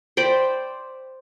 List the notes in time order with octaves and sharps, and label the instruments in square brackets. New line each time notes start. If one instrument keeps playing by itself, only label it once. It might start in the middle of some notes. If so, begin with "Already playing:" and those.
[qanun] C5 D5 G5 B5